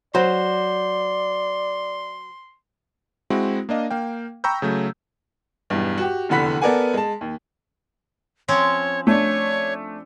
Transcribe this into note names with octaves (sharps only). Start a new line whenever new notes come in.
F#3 C5 D5 C6
G#3 C4 E4 F#4
A#3 D4 D#5 F5
A#3 F5 G5
G5 A#5 B5 C#6 E6 G6
C#3 F#3 A3
B1 E2 G2
F#4 G4
F1 E2 D3 F#5 B5 B6
B3 A4 A#4 D5 F#5 G#5
G#3 A5
D#2
F3 C4 C#4 C#5
A3 D4 C#5